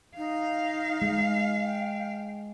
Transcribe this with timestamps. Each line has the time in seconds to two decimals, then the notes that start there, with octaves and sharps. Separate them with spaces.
0.17 D#4 F5
1.02 G#3
1.63 G5